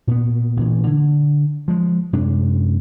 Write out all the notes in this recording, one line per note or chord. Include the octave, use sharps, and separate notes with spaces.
A#2 B3
A1 A#2 E3
D3
F3 G#3
F#2 C3 G#3 D4